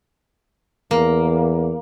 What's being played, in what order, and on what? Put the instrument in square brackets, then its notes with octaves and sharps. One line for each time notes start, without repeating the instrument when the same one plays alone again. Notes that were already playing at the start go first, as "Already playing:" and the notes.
[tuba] E2 [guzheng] A#3